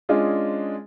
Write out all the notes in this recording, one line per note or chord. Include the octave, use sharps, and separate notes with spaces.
G#3 C#4 D4 F4 G#4